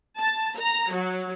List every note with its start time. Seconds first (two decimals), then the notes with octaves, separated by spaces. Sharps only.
0.18 A5
0.57 A#5
0.93 F#3